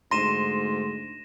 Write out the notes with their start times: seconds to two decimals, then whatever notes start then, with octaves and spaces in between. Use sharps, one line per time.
0.11 D2 G#2 C6 A#6 D#7 E7